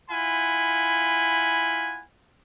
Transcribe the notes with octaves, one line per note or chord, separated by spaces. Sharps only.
E4 F4 F#5 G#5 B5